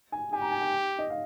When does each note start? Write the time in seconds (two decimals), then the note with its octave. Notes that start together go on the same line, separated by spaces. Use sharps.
0.12 G#5
0.32 G4 G#5
0.42 A#5
0.52 G#5
0.61 G5
0.99 D#5
1.10 F5